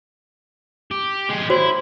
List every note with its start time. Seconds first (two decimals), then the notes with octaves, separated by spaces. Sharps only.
0.91 G4
1.29 G#3 G4
1.50 E4 F#4 C5 C#5